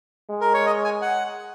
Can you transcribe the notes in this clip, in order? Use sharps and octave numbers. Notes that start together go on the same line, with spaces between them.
G#3
A#4
C#5
D#5
G#5
F#5